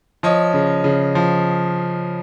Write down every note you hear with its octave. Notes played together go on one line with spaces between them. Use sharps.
F3 C#5 D#5
C#3
C#3
F3